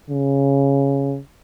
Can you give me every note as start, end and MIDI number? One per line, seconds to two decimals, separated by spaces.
0.10 1.19 49